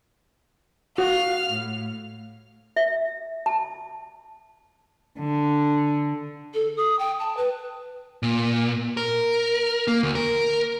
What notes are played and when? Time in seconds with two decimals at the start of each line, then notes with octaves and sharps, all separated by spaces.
0.98 F#4 F5 F6
1.51 A2
2.76 E5
3.46 A5
5.19 D3
6.54 A4
6.77 D#6
6.99 G5
7.19 A5
7.36 B4
8.23 A#2
8.97 A#4
9.88 A#3
10.03 D2
10.15 A#4